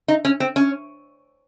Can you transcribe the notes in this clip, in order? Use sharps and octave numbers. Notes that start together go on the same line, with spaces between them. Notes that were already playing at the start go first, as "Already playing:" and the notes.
D#4
C#4
C4
C#4